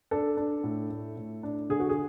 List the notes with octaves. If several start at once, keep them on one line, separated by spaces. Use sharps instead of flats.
D4 A4
D4
A2
A3
A2
D4
D3 G#4
F#4
G#4